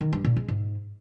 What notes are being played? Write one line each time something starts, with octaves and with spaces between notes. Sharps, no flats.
D#3
G2
A#2
G#3
G#2